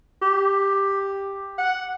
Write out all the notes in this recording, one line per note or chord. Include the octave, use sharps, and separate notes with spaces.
G4
F#5